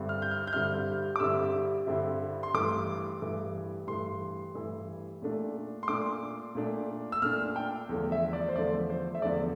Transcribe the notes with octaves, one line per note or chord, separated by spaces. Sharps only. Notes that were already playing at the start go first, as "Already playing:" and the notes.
Already playing: G2 D3 G3 C4 E4
F6
G6
F6
G6
G2 D3 G3 C4 E4 F6
D6
G2 D3 G3 C4 E4 E6
G2 D3 G3 C4 E4
C6
G2 E3 A3 D6
G2 E3 A3
G2 E3 A3 C6
G2 E3 A3
A#2 A3 D4
C6
A#2 A3 D4 D6
A#2 A3 D4
E6
A#2 A3 D4 F6
G5
E2 D3 F3 A3
E5
D5
C5
E2 D3 F3 A3 D5
C5
E5
E2 D3 F3 A3 D5